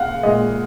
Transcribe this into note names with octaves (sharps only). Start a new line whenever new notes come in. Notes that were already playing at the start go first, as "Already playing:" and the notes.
Already playing: A#2 F5 F#5
A#2 G#3 D#5